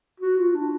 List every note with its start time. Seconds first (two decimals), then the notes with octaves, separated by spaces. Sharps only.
0.20 F#4
0.38 F4
0.54 D4